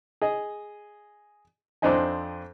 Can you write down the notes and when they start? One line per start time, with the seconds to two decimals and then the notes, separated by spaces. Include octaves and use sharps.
0.22 G#4 D#5
1.82 F2 C4 D4 C5 D#5 G#5